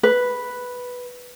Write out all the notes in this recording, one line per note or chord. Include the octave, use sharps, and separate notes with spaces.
B4